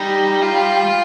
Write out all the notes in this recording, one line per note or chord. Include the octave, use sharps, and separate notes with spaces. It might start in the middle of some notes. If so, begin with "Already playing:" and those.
Already playing: G3 D#4
F4